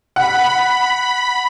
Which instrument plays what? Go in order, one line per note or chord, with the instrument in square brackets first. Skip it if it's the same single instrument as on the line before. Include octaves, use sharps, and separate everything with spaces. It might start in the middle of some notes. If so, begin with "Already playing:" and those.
[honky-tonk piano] F#5 [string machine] B5